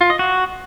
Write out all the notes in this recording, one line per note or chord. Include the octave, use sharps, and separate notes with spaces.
F4
D#5
F#4